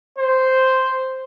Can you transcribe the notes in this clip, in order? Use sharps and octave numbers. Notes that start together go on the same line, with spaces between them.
C5